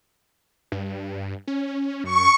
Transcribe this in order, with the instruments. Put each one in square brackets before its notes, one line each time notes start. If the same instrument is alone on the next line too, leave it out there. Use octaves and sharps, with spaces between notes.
[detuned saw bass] G2
C#4
[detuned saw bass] F#2 [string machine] C#6